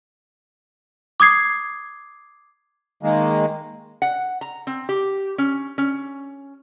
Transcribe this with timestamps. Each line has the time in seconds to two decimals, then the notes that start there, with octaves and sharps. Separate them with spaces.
1.20 D6 D#6 G#6 C7
3.03 D#3 G#3 A#3
4.02 F#5
4.41 A#5
4.67 C4
4.89 G4
5.38 C#4
5.78 C#4